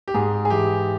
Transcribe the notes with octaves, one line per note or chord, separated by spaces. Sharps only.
G4
G#2 G#4
G#4
E3 G4